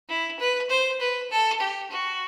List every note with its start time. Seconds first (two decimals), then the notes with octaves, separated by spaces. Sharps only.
0.09 E4
0.39 B4
0.69 C5
1.00 B4
1.31 A4
1.60 G4
1.90 F#4